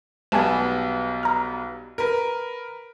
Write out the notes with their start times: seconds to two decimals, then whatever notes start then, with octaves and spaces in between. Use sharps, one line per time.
0.32 B1 G3 B3 G#5 A5 E7
1.23 A#5 F6
1.98 A#4 B4